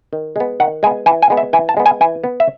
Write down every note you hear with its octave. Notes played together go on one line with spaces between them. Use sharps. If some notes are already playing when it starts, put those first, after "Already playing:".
D#3
G#3 B3
D#3 F#5
G#3 B3 G#5
E3 G#5
G#5
G#3 B3
E5
E3 G#5
A5
G#3 B3
G#5
E3 G#5
B3
E5